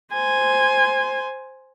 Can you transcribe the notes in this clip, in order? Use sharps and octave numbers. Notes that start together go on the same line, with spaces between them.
C5 G#5